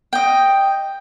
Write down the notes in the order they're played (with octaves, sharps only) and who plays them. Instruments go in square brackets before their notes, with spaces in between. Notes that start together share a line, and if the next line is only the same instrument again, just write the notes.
[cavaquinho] D#5 G5